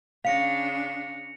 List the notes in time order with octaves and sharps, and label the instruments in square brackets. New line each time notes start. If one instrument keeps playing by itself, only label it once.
[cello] C#3 D4 [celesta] F5 [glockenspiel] A#6 C#7 F7